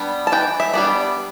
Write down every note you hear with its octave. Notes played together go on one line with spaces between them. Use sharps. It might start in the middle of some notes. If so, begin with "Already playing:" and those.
Already playing: G3 B3 D4
A5
E3 G5
E5
G3 B3 D4